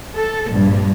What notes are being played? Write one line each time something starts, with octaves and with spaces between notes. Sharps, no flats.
A4
A#1 G2